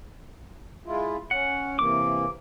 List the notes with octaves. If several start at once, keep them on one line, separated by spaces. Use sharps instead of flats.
G#3 E4 F4
C#4 F#5
C3 E3 A#3 D6